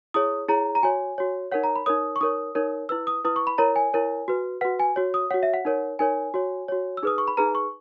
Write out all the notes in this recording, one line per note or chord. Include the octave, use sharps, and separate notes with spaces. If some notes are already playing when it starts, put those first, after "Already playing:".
E4 G#4 C#5 D#6
E4 G#4 C#5 A#5
A#5
F#4 C#5 G#5
F#4 C#5
D#4 A#4 C#5 F#5
A#5
B5
D#4 A#4 C#5 D#6
C#6
D#4 A#4 C#5 D#6
D#4 A#4 C#5
E4 B4 E6
D#6
E4 B4 D#6
C#6
B5
E4 A#4 C#5 A#5
G#5
E4 A#4 C#5
F#4 B4
F#4 B4 F#5
G#5
F#4 C#5
D#6
F#4 C#5 F#5
E5
F#5
D#4 A#4 C#5
D#4 A#4 C#5 G#5
F#4 C#5
F#4 C#5
E6
D#4 G#4 B4 D#6
C#6
B5
D#4 G#4 B4 A#5
C#6